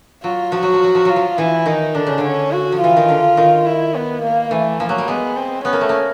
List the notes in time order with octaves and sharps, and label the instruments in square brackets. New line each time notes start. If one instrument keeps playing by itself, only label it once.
[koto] F#3 [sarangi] F4
[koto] F3 [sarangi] F#4
[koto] F#3
F3
F#3
F3
[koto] F#3 [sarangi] F4
[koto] F3
[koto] E3 [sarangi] E4
[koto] D#3 [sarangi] D#4
[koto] D3 [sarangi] D4
[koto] C#3
D3
[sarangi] C#4
F#4
[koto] F3
[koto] E3 [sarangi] F4
[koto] D#3
D3
D#3
[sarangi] E4
B3
A#3
[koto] E3 [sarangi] A3
[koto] F3 [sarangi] A#3
[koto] F#3
G3
[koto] G#3 [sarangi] B3
[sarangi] C4
[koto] B3 [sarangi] C#4
[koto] A#3
A3
A#3